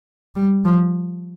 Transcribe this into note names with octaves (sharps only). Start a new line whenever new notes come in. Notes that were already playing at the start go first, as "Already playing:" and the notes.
G3
F3